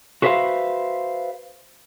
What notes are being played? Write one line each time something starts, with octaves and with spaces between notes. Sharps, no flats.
F#4 G#4 B4 C5 E5 F5